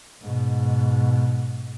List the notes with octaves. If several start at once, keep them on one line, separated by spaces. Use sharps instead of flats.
G#2 B2